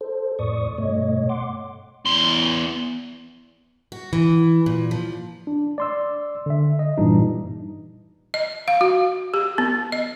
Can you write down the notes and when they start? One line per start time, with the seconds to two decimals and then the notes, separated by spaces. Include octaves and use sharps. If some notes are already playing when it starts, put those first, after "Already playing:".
0.01 A4 C5
0.39 F2 A2 D5 C#6 D#6
0.78 G2 B2 A3 C#5 D#5
1.29 F#5 C6 D6
2.05 E2 C6
3.92 F#4
4.13 E3
4.66 A#2
4.91 F3
5.47 D4
5.78 D5 C6 E6
6.46 D3 E5
6.79 D#5
6.98 G2 A#2 E3 G3 D4 D#4
8.34 D#5
8.68 F5
8.81 F#4
9.34 G4
9.58 B3
9.92 D#5